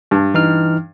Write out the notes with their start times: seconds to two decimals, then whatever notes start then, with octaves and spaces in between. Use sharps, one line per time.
0.11 G2
0.34 E3 D#4 F6